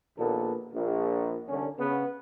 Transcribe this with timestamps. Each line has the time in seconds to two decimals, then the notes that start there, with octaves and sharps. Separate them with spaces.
0.18 A#1 D#2 A#2 A#3 B3 A4
0.74 A#1 A#2
1.48 C2 D3 C#4
1.78 C#3 B3